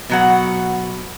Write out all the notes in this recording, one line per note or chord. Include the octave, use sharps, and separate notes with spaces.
B2 F#3 F#5